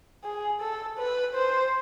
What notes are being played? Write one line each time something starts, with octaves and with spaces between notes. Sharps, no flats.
G#4
A4
B4
C5